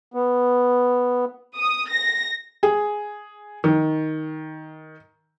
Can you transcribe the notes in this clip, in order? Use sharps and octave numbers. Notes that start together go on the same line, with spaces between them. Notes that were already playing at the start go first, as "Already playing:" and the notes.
B3
D#6
A#6
G#4
D#3